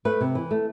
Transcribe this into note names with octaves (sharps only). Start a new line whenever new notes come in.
A3 B4
C3
E3
A3